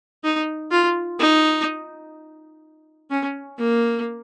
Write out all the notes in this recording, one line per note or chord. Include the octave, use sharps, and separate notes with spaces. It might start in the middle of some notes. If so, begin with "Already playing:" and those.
D#4
F4
D#4
C#4
A#3